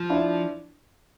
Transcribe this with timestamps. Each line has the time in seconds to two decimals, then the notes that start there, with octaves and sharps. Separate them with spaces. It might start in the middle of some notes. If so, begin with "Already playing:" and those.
Already playing: F3
0.10 D4 E4